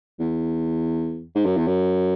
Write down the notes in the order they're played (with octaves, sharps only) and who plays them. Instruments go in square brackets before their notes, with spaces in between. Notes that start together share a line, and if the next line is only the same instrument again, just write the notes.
[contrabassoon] E2
G#2
F#2
E2
F#2